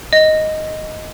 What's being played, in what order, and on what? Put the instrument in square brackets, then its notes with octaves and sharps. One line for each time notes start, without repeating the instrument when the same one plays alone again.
[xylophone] D#5